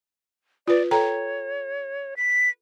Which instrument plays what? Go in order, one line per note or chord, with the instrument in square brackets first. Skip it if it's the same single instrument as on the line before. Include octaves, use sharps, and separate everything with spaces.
[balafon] F4 B4 [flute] D5
[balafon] A4 G5 A#5 [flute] C#5
[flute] B6